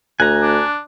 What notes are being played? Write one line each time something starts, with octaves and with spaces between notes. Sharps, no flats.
D2 G#5 A#5 F#6
D4